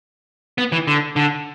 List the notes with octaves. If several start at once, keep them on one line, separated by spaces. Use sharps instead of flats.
B3
E3
D3
D3